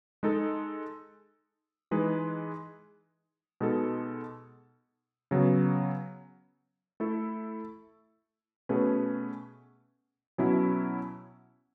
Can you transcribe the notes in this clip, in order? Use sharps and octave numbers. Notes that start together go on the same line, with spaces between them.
G#3 D#4 A4
E3 G#3 D#4 G#4 B4
B2 G#3 D#4 A4
C#3 F#3 B3
A3 E4 A4
B2 A3 C#4 G#4 B4
B2 F#3 C#4 E4